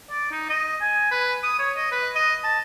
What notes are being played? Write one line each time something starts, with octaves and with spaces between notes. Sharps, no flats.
D5
D#4
D#5
G#5
B4
D#6
C#5
D#5
B4
D#5
A5